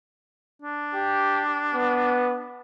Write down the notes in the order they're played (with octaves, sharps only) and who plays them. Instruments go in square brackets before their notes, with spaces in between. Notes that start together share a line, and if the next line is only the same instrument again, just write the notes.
[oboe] D4
[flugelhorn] G4
B3